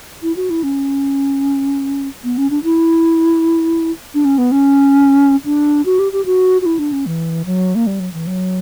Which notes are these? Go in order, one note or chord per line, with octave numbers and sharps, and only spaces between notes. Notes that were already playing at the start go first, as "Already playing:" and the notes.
E4
F#4
E4
C#4
B3
C#4
D4
E4
D4
C#4
B3
C#4
D4
F#4
G4
G4
F#4
F#4
E4
D4
C#4
E3
F#3
A#3
G3
F#3
E3
F#3